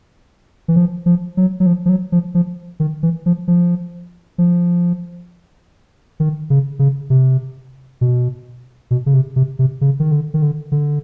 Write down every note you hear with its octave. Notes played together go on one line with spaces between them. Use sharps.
E3
F3
F3
F#3
F#3
F3
F3
F#3
F3
F3
D#3
E3
F3
F3
F3
D#3
C#3
C#3
C3
B2
B2
C#3
C3
C3
C3
C#3
D#3
D3
D#3
D3
D3